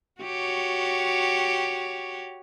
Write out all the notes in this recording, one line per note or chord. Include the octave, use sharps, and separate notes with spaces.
F#4 G4 C#5